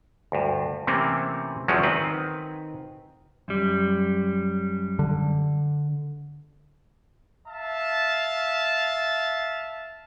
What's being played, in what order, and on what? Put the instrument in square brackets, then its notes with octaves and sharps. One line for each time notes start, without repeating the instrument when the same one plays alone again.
[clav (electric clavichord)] D2 G2
C3 E3 A3 A#3 C4 C#4
E2 F3 F#3 G#3 A3 C#4
D#3 C4 B4
[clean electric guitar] F#2 G3
[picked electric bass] D3
[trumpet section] E5 F5 A5